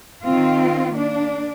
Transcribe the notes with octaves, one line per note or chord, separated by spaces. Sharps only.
D#3 C4 F4
A#3 D4